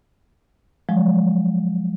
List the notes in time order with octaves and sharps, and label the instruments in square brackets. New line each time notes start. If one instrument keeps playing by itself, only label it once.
[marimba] F3 F#3 G#3